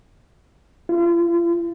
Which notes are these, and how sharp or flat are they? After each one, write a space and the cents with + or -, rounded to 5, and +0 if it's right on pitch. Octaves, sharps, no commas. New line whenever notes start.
F4 -40